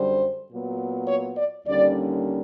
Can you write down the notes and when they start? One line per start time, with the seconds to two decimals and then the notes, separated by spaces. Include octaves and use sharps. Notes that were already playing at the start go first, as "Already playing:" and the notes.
Already playing: F#2 D3 G3 C5
0.51 A#2 F#3 B3
1.08 C#5
1.37 D5
1.66 D#2 D3 G3 A#3 C#4 D5